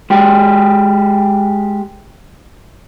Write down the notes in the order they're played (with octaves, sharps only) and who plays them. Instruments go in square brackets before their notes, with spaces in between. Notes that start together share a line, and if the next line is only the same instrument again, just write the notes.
[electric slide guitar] G#3 G4